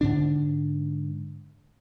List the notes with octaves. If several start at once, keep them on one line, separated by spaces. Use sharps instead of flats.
G#2 D3 D4